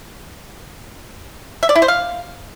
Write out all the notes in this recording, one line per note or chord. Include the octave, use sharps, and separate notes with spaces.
E5
D5
E4
C5
F5